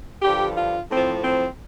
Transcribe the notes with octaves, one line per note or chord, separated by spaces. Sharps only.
G2 D3 F3 G4
F4
A2 F3 C4
C4